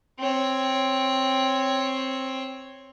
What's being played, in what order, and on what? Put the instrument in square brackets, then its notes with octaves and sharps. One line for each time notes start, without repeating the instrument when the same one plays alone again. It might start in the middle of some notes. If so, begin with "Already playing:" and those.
[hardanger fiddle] C4 C#5